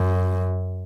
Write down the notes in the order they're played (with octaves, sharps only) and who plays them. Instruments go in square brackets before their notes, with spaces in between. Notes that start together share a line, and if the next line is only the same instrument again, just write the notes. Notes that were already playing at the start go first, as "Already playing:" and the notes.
Already playing: [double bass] F#2